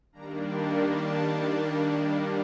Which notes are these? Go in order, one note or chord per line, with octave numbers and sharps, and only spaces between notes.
D#3 G3 A#3 D4 A#5
C6
A5